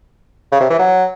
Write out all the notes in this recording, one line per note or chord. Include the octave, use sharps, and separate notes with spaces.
C#3
C3
E3
F#3